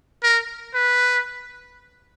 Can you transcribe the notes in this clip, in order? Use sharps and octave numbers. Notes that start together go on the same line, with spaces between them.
A#4
B4